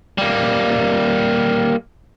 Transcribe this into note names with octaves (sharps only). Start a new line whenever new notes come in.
G3 A#3